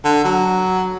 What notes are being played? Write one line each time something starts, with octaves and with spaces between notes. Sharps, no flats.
D3
F#3